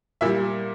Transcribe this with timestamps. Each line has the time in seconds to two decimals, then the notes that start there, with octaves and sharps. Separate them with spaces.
0.21 A#2 E4 E5
0.25 G3